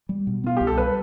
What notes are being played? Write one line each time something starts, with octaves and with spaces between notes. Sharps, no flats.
G3
B2
B3 F4
C2 G4
A4
G3 B4